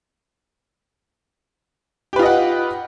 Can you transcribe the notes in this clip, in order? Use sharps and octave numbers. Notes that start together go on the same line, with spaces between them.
F4 G4 B4 D#5 F#5